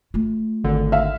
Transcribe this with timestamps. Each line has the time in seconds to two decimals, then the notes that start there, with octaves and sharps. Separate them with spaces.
0.14 A3 F4
0.64 G#1 D3
0.92 E5 F5